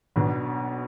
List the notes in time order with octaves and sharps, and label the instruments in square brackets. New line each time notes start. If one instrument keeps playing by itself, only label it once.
[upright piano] B1 B2 B3 D4